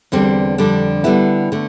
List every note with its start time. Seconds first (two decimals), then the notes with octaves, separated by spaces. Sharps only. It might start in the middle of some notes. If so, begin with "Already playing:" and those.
0.12 E2 D3 G3 C4
0.58 F2 D3 G3 D4
1.04 D3 G3 B3 E4
1.52 D3 A3